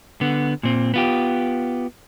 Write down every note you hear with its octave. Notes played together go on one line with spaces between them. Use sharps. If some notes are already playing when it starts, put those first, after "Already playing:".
D3 B3
A#2 C4
B3 F4 G4